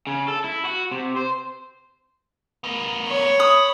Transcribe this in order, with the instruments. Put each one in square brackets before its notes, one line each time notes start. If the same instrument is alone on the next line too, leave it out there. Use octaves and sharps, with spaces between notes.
[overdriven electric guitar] C#3
A4
E4
F#4
C3
C5
[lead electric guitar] B3 A#4
[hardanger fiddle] C#5
[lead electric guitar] B5 [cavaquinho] D#6